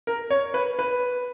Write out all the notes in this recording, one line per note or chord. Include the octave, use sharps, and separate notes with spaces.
A#4
C#5
B4
B4